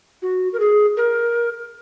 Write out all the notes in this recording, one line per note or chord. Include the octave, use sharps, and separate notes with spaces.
F#4
A#4
G#4
A#4